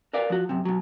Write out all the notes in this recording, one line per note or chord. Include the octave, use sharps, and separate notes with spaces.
A#4 B4 D5 F5
F3 F#4
F#2 C3
B2 F#3